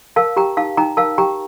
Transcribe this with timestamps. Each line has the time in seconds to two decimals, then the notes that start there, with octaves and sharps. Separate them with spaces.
0.16 A#4 F5 A5
0.36 G4 G5 A#5
0.57 D#4 F5 A5
0.77 D#4 G5 A#5
0.97 A#4 F5 A5
1.18 G4 G5 A#5